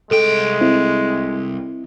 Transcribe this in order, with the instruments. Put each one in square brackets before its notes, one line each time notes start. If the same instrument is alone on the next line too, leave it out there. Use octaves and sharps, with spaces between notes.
[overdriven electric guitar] C2 G5 [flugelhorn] G#3 [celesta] A4
[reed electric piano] C4 E4